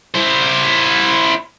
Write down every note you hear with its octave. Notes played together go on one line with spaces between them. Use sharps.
E4 C5